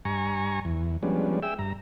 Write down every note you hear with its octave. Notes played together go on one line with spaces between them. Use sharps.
G2 G#5 A#5 C#6
E2
F3 G3 G#3 B3 C#4 D4
G#4 E5 G5 E6
G2 A#5